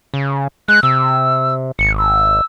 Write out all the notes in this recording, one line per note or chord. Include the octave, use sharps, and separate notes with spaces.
C#3
G#3 F#6
C3 E6
G#1 C#7
E6